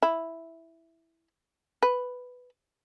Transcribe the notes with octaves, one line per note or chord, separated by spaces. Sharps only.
E4
B4